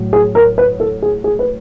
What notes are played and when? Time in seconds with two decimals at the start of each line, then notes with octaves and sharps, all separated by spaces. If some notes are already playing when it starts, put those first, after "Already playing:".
Already playing: A2 F#3
0.13 G#4
0.35 A#4
0.58 B4
0.80 A4
1.02 G#4
1.24 G#4
1.39 B4